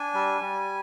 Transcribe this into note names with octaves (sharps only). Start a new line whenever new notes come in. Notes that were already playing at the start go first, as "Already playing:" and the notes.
Already playing: D4 G#5
G3
G3